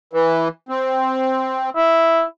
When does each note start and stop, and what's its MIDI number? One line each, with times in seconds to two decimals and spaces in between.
0.13 0.48 52
0.69 1.70 60
1.76 2.22 64